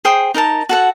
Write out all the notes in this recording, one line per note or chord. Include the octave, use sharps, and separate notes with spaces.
G#4 C5 G5 D#6
D#4 A#4 F#5 A5
F#4 A4 F#5